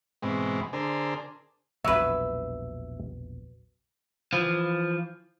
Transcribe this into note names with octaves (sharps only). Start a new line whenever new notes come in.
G#2 B2 E3 G#3 C4
D3 D4 G#4 A#4 C5
E1 A#1 F#3 B4 E5
E3 F3